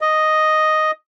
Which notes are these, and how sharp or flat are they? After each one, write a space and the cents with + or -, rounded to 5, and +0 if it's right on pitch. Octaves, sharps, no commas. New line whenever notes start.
D#5 +0